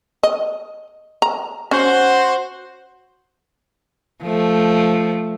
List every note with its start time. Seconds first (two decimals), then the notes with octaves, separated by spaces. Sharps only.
0.23 D#5
1.22 A#5
1.71 C#4 F#4 C5
4.23 F3 A3